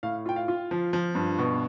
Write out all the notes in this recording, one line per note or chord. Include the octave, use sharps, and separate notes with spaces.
A2 F5
F4 G5
F5
F4
F3
F3
G2
B2